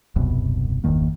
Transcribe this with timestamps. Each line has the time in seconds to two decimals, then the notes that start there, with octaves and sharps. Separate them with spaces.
0.16 D#1 C2 F#2 B2
0.84 G1 E2 D#3 A#3